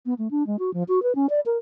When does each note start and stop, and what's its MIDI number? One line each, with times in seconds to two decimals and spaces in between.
0.06 0.14 59
0.18 0.28 57
0.31 0.46 62
0.47 0.57 56
0.59 0.73 66
0.74 0.83 53
0.88 1.02 66
1.03 1.15 71
1.15 1.26 61
1.30 1.40 74
1.46 1.57 70